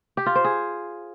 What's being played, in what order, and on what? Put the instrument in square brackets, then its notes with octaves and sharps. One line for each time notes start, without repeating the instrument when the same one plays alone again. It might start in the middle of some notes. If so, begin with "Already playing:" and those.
[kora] G4
F4
C5
G#4